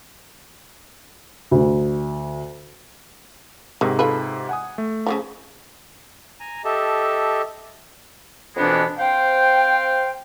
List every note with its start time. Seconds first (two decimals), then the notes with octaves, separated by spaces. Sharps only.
1.51 D2
3.81 G#2 C3 D#3
3.99 F4 A4 B4
4.49 F#5 G#5 D#6
4.78 A3
5.07 C#3 E3 F3
6.40 G#5 A#5
6.65 G4 A4 D#5 E5 A5
8.56 F2 B2 E3 G#3 B3 D4
8.98 C4 C5 F5 G5